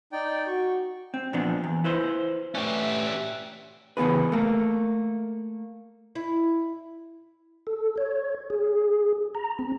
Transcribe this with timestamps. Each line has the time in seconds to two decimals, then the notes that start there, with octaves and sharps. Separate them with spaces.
0.12 D#4 D5 G5
0.47 F#4 C#6
1.14 C4
1.33 A#2 F3 B3 D4
1.64 E2
1.84 E4 B4 C5
2.55 A3 C#4 G4 B4 D5 E5
3.97 C#3 E3 B3 G#4 B4
4.32 A3 A#3
6.15 E4
7.67 A4
7.98 C#5
8.50 G#4
9.35 A#5
9.59 C4